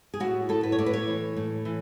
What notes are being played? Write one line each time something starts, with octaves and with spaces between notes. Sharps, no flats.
G#4
A2 F#4
A2 A4
B4
C#5
A2 D5
B4
C#5
E3
A2
E3